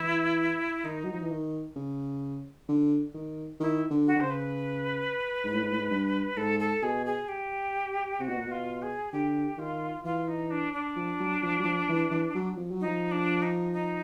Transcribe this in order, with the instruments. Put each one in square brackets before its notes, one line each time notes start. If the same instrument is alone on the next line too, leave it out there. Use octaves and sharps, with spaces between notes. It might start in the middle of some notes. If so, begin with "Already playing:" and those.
Already playing: [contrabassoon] E3 [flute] E4
[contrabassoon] D#3 [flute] D#4
[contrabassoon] F#3
F3
E3
D#3
C#3
D3
D#3
[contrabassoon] D#3 [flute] E4
[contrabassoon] D3
[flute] F#4
[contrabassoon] D3
[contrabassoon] C#3 [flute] C5
[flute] B4
[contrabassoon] G#2
A2
G#2
A2
G#2
G2
[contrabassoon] G#2 [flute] A4
[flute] A4
[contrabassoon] B2 [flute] G#4
[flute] G#4
G4
[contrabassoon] C3 [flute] F#4
[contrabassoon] B2
A#2
[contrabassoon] B2 [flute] F4
[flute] G#4
[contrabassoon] D3 [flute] G4
[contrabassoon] D#3 [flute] F4
[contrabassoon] E3 [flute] F4
[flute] D#4
D4
D4
[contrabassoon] F3
F#3
F3
F#3
F3
E3
E3
F#3
F3
F#3
[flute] D#4
[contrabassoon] F3
[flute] D4
D#4
D#4